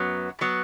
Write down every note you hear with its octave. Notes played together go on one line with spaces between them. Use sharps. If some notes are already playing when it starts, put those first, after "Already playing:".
Already playing: F#2 F#3 B3
F#3 B3